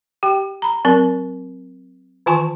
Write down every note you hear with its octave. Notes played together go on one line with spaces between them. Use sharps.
G4 G5
A#5 B5
F#3 C4 A#4
D#3 E3 F4 G#5 A5 C#6